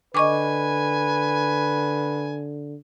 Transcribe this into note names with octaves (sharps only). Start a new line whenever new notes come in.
D3 B4 D#5 G#5 C#6 D6